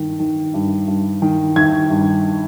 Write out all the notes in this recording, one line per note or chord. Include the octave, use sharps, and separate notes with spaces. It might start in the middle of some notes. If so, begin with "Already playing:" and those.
Already playing: G2 D#3
D#3
G2
G2
D#3
D#3 G#6
G2